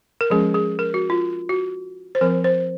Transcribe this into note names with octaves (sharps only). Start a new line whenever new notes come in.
A#4
F3 G#3 C#4 G#4
G#4
A#4
F#4
F4
F#4
C5
F3 C4 A#4
C5